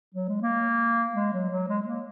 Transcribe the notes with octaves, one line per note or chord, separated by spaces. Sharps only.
F#3
G#3
A#3
G#3
F#3
F#3
G#3
G#3
A#3